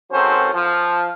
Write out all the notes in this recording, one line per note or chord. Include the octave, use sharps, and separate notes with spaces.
G#1 F#3 C4 C#4 A4 C5
F3